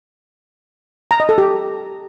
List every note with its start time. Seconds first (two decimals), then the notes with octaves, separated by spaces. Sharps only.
1.11 A#5
1.20 D#5
1.29 A4
1.38 G4